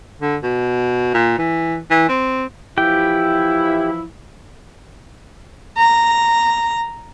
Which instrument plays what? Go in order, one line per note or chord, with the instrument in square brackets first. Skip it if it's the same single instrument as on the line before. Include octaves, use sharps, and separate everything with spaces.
[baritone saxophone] D3
B2
A#2
E3
E3
C4
[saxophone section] E3 F3 E4 [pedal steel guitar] G4 G5
[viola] A#5